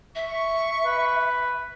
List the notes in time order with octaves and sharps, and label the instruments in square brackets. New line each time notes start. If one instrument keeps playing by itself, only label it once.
[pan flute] E5 [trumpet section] C#6
[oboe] B4